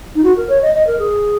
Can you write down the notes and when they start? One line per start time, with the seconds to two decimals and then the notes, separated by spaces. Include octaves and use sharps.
0.15 D#4
0.24 F#4
0.37 A#4
0.49 C#5
0.62 D#5
0.74 D#5
0.87 A#4
0.99 G#4